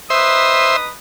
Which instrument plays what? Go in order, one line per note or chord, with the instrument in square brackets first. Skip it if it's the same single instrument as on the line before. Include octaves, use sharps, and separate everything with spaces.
[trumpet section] D#4 B4 D#6 [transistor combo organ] C5 E5